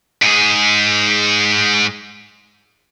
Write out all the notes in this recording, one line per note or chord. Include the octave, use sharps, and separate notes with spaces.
G#2 G#4